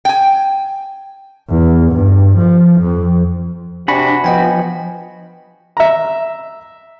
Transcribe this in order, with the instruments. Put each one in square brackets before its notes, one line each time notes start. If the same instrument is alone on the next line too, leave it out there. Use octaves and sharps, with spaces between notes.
[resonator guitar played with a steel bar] G5 G#5
[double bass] E2
G2
F3
F2
[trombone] C3 [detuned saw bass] D4 [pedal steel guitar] F#4 B5 [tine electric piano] G#5
[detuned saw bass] F3 [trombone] B3 [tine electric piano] D#5 G5 G#5
[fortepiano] E5 A#5